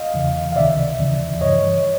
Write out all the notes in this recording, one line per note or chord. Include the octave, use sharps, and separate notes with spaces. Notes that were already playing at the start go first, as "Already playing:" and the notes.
Already playing: D#5 F5
E2 C#3 E3
F5
C#2 C3 D#3 D5 E5
D#2 C#3 E3
G2 E3 C#5 D#5